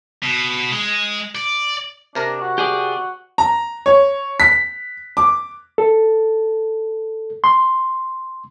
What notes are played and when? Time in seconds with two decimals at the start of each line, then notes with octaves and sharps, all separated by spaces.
0.23 B2
0.72 G#3
1.35 D5
2.15 C3 D4 A#4 A#5
2.41 F#4
2.58 G4 G#4 D5
3.38 A#5
3.86 C#5
4.40 B6
5.17 D6
5.78 A4
7.44 C6